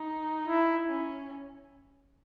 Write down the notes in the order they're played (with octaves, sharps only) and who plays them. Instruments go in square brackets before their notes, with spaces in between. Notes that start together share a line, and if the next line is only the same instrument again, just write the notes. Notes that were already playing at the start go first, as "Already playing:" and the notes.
Already playing: [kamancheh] D#4
[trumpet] E4
[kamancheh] C#4